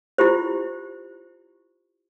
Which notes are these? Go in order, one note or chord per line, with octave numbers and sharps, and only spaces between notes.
E4 F4 G4 C5